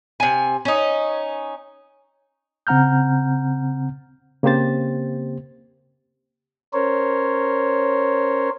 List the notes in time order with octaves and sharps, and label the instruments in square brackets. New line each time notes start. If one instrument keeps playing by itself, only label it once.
[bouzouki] C3 G#5
C#4 D#4
[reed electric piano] C#3 C4 F#5 A#5 F6 G6
C#3 A#3 C4 G4 C5 A6
[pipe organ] C#4 A#4 C5 C#5